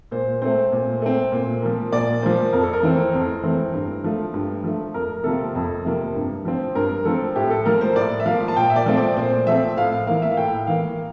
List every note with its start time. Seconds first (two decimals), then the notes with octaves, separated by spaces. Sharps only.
0.11 A#2 C5
0.42 A3 C4 C5
0.72 A#2
1.02 A3 C4
1.32 A#2
1.62 F3 A#3
1.92 A#2 D5
2.22 F3 A#3 C5
2.53 F2 A#4
2.63 A4
2.73 A#4
2.83 E3 A3 C4
3.13 F2
3.43 E3 A3 C4
3.74 G2
4.04 F3 A3
4.34 G2
4.64 F3 A3
4.94 F2 A#4
5.24 C3 F3 A#3 A4
5.55 F2
5.85 C3 F3 A#3
6.15 G2
6.45 F3 C4
6.75 G2 A#4
7.05 F3 C4 A4
7.36 A2 G4
7.50 A4
7.65 F3 A#3 A#4
7.81 C5
7.96 A2 D5
8.20 E5
8.26 F3 A#3 F5
8.48 A5
8.56 A#2 G5
8.70 E5
8.76 D5
8.86 F3 A3 C4
8.97 D5
9.16 A#2 C5
9.47 F3 A3 C4 E5
9.77 A2 F5
9.92 F5
10.07 E3 A#3 F5
10.22 E5
10.32 F5
10.37 A2 G5
10.67 E3 A#3 F5